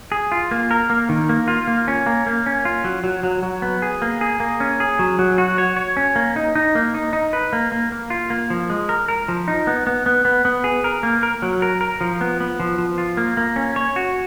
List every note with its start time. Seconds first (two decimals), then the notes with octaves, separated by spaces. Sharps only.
0.12 G#4
0.32 F4
0.51 A#3
0.71 A#4
0.90 A#3
1.09 D#3
1.29 A#3
1.48 F4
1.67 A#3
1.88 C#4
2.06 A#3
2.26 A#3
2.46 C#4
2.65 F4
2.84 F#3
3.04 F#3
3.23 F#3
3.43 F#3
3.62 B3
3.82 G#4
4.02 A#3
4.21 G#4
4.40 A#3
4.60 C#4
4.80 G#4
4.99 F#3
5.19 F#3
5.38 F#4
5.58 C#5
5.76 C#5
5.97 C#4
6.16 A#3
6.36 D#4
6.55 D#4
6.75 A#3
6.94 D#4
7.13 D#4
7.33 B4
7.53 A#3
7.72 A#3
7.92 A#3
8.10 F4
8.30 A#3
8.50 F3
8.70 G#3
8.89 A#4
9.08 A#4
9.28 F3
9.48 D#4
9.67 B3
9.87 B3
10.06 B3
10.25 B3
10.45 B3
10.64 G#4
10.84 A#4
11.03 A#3
11.23 A#4
11.42 F#3
11.62 A#4
11.81 A#4
12.01 F3
12.21 B3
12.40 B3
12.60 F3
12.78 F3
12.98 F4
13.17 A#3
13.37 A#3
13.56 C#4
13.76 C#5
13.96 F#4